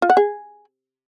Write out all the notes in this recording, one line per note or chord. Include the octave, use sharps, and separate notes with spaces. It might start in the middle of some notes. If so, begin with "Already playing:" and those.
F4
F#5
G#4